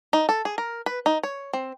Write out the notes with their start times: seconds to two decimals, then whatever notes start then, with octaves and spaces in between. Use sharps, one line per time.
0.13 D#4
0.29 A4
0.45 G#4
0.58 A#4
0.86 B4
1.06 D#4
1.23 C#5
1.53 C4